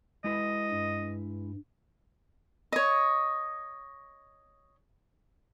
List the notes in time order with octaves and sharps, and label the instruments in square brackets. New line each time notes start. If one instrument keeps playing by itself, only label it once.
[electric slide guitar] G#3 E4 B4 [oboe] D#5
[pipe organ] G2
[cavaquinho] C#5 D#5